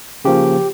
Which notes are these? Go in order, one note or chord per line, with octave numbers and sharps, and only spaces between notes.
C#3 F3 A#3 G4